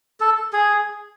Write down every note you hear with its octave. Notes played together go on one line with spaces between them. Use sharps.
A4
G#4